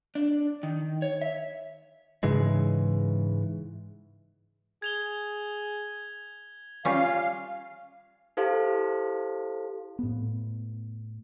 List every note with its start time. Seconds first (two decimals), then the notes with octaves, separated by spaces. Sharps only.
0.15 D4
0.63 D#3
1.02 C#5
1.22 E5
2.23 G#2 C#3 E3 G#3
4.82 G#4 G#6 F7 G7
6.85 G3 C#4 F4 F5
8.37 E4 G4 A4 C5 F5
9.99 A2 B3